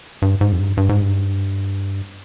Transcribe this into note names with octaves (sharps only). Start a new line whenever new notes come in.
G2
G#2
F2
G2
G2
G#2
G2